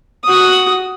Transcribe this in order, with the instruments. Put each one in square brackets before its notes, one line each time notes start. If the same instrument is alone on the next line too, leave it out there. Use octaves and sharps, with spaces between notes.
[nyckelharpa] F#4 D#6